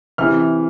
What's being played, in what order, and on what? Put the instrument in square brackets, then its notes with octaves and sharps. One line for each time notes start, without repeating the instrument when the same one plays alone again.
[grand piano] C3 E3 F6